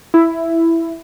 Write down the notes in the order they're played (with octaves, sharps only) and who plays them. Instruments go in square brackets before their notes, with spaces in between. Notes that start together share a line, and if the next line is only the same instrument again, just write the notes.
[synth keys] E4